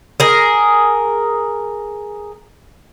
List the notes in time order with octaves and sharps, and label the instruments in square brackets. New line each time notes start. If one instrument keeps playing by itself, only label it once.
[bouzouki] G#4 A#4